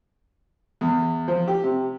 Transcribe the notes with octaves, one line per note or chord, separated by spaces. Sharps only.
E2
F3
G4
C3